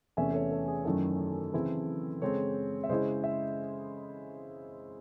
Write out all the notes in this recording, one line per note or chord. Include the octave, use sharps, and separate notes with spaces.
E2 C3 E3 A3 C#4 E5 G#5
A4 C#5
A4
G#4
F#2 D#3 A3 C#4 E4 A4
C#3 E3 C4 E4
C#3 G#3 C4 A4 C#5
E5
C#3 G#3 C#4 E4 C5 D#5
E5